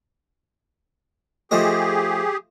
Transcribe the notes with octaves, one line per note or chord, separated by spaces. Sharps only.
F3 A3 G4 G#4 D#5